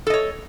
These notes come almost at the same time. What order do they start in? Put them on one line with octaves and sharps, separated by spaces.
A4 D#5 C#5